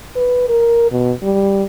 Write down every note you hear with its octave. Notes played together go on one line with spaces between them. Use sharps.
B4
A#4
B2
G3